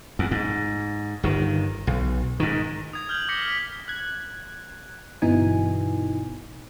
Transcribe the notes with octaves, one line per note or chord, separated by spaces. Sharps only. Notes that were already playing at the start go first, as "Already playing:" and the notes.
E2
G#2
G1 D#3
B1
G#2 D#3
D#6 G#6
F6 G6 F#7 G7
D6 A#6 B6 C#7
F6 B6
F#6 G#6
G1 B2 E3 D#4 G#5